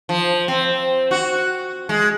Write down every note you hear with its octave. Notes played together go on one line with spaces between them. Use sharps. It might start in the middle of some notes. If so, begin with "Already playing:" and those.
F3
C4
F#4
G#3